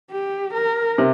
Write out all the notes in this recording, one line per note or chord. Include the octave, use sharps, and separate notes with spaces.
G4
A#4
C3